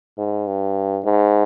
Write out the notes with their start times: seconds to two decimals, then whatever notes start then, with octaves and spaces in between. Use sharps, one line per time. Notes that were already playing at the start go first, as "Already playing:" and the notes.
0.18 G#2
0.47 G2
1.05 G#2